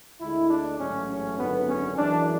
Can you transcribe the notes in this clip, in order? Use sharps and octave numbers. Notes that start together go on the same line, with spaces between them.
D2 D3 G#3 E4
D4
A1 G#2 F#3 A3 C#4
C#4
G#1 F#2 D3 B3
C#4
F#2 E3 G#3 D4